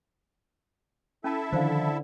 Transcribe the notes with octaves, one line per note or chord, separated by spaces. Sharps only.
C#4 E4 A4 E5 A5
D3 D#3 F3 C5 F5